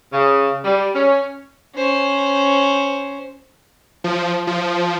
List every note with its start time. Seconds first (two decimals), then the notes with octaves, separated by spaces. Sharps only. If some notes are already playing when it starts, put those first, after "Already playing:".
0.12 C#3
0.65 G3
0.95 C#4
1.75 C#4 C5
4.04 F3
4.47 F3